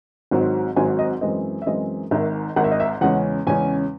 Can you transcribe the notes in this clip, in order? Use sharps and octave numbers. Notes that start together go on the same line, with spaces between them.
G#1 G#2 F#3 C4
G#1 G#2 F#3 C4 G#5
D#5
F#2 E3 G#3 C4 D#5
E5
F#2 E3 G#3 C4 D#5
G#1 G#2 D#3 E5
G#1 G#2 D#3 F#5
E5
D#5
E5
E2 C#3 G#3 C#4 F#5
E2 C#3 G#3 C#4 G#5